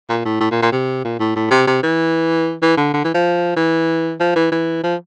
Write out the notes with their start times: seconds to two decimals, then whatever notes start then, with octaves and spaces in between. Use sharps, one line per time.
0.09 A#2
0.25 A2
0.41 A2
0.51 A#2
0.62 A#2
0.72 C3
1.04 A#2
1.20 A2
1.36 A2
1.51 C3
1.67 C3
1.83 E3
2.62 E3
2.77 D3
2.93 D3
3.04 E3
3.14 F3
3.57 E3
4.20 F3
4.36 E3
4.52 E3
4.84 F3